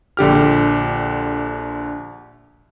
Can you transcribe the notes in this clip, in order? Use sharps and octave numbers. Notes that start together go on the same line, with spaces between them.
A#1 D3 G4 F6